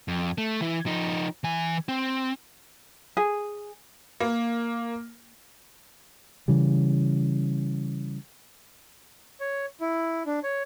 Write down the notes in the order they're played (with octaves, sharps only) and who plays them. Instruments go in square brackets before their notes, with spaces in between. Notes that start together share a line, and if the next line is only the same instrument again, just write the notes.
[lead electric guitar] F2
A3
E3 E4
F3 D#4
E3 G#5
C4
[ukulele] G#4
[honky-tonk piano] A#3
[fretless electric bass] C#3 E3 G3
[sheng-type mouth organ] C#5
E4
D4
C#5